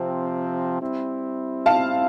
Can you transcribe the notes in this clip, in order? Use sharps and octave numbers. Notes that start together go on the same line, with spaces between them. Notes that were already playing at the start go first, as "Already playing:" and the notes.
Already playing: C3 F3 C4
G3 C4 E4
F5 A5